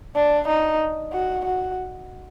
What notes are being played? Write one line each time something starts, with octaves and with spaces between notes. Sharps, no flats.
D4
D#4
F#4
F#4